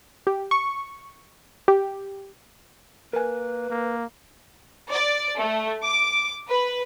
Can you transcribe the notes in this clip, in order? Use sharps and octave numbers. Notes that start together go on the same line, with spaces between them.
G4
C#6
G4
A#3 A#4 B4 G#5
A#3
D5
A3
D6
B4